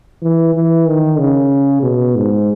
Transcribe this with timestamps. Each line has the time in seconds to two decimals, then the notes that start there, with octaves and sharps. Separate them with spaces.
0.22 E3
0.54 E3
0.87 D#3
1.18 C#3
1.82 B2
2.16 G#2